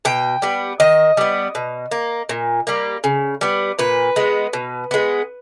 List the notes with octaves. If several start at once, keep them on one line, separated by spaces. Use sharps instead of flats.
B2 G5
G3 B3
D#3 D#5
G3 B3
B2
A#3
A#2
G3 A#3
C#3
G3 B3
A#2 B4
G#3 B3
B2
G#3 B3